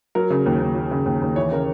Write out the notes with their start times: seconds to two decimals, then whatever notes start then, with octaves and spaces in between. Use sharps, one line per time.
0.15 F#3 A#4
0.30 C#3
0.46 D#2
0.61 D#2
0.75 F#3
0.91 C#3
1.06 D#2
1.21 D#2
1.36 E3 C#5
1.51 C#3 A#4